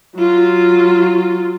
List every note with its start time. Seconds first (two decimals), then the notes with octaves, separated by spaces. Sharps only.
0.16 F#3 F4